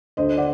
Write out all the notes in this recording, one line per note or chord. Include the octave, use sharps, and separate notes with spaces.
D2 C5 D#5
D5 F#5